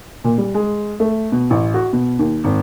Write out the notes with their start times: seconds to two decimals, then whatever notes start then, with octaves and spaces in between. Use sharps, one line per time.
0.24 A#2
0.38 G3
0.54 G#3
1.00 A3
1.32 B2
1.50 A1
1.74 F#4
1.93 B2
2.19 D#2
2.44 G#1